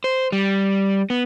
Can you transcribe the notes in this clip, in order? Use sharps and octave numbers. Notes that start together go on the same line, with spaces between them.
C5
G3
B3